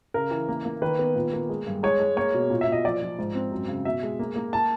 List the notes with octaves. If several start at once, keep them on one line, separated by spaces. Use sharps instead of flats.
C#3 A#4
E3
A#3
A#3
D#3 B4
B3
A#2
A#3
G#3
G2
G#3 C#5
G#3
A#3 C#5
B2
A#2
E5
A#2
D#5
F3 D5
F3
G#2
C4
F#2
C#3
B2 E5
G#3
A#3
A#3
A5